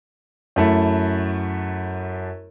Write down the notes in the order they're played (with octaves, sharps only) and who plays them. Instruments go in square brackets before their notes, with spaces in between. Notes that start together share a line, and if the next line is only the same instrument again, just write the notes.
[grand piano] F#2 A3 E4